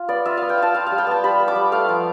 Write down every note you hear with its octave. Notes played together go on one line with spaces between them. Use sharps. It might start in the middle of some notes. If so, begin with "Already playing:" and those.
Already playing: F4
B3 D5
F4 E5
B3 F5
G5
F4 A5
F4 F5
G3 F5
G5
B3 A5
G3 B5
B3
D6
G3
A3 F5
F3